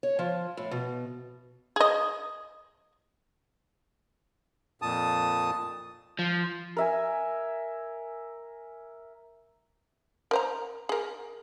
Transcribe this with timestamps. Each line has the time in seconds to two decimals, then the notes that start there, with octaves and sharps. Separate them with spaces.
0.03 C#5
0.19 F3
0.57 A2
0.71 B2
1.76 G#4 D#5
4.82 F2 A#2 A5 D#6
6.19 F3
6.77 A#4 E5 G#5
10.31 A#4 C5 A#5
10.89 G#4 A#4